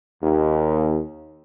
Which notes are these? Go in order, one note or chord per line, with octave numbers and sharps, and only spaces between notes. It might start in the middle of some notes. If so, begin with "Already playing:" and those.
D#2